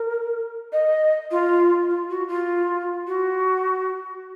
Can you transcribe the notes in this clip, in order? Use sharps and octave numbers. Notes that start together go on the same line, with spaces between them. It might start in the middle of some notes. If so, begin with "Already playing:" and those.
Already playing: A#4
D#5
F4
F4
F#4
F4
F#4